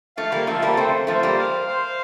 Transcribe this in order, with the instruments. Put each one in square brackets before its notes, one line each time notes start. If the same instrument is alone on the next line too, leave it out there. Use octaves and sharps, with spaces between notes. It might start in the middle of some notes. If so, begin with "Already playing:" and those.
[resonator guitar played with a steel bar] F3 A3 [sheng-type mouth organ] F5
[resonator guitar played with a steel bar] G3 A#3
[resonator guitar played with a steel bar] F3 A3 [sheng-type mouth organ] A4
[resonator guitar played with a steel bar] G3 A#3
[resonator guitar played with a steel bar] A3 C4 [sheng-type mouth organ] C5
[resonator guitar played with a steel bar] F3 A3 [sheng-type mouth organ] C5
[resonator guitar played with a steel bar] G3 A#3
[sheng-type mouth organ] F5
C5